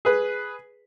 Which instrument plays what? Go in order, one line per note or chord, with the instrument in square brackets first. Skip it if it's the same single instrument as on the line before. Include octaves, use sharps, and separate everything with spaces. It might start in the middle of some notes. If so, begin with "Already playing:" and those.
[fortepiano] G#4 B4